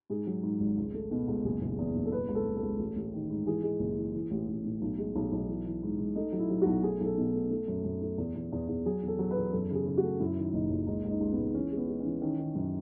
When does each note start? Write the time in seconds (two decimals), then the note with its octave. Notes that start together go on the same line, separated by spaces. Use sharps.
0.10 G#2 G#4
0.27 F#3
0.43 G#2
0.60 G#1
0.78 C#2
0.94 A3
1.11 B2
1.28 C#2
1.45 F#1 G#4
1.62 F#1
1.78 E2
1.95 F#1
2.05 A4
2.12 B2 B4
2.29 C#2
2.35 A4
2.46 C#2
2.57 A4
2.63 C#2
2.79 A1
2.96 A1
3.14 D#3
3.30 G#2
3.46 E3 G#4
3.63 G#3
3.80 F#1
3.97 E3
4.14 E3
4.31 A1
4.48 A1
4.65 A2
4.82 B1
4.98 G#3
5.15 B1
5.32 B1
5.48 E3
5.66 E3
5.83 G#2
5.99 G#2
6.16 A3 D#4
6.33 F#3
6.39 E4
6.50 F#3
6.62 B1 F#4
6.83 A3 G#4
7.01 B1
7.06 A4
7.17 B2
7.34 A3
7.51 A3
7.68 F#2
7.85 F#2
8.01 A3
8.18 E2
8.36 E2
8.52 E2
8.69 E2
8.86 F#3 G#4
9.03 E2
9.08 A4
9.19 F#3
9.31 B4
9.36 E2
9.52 F#2 A4
9.70 C#3 G#4
9.86 C#3
9.97 F#4
10.03 A3
10.20 F#2 E4
10.37 D#3
10.54 F#1 D#4
10.70 F#1
10.87 C#2 D#4
11.05 C#2
11.10 D#4
11.21 C#2
11.32 B3
11.38 C#2
11.54 E3 C#4
11.72 G#3
11.77 B3
11.88 G#3
12.00 E3 C#4
12.22 D#3 C#4
12.39 D#3
12.55 F#2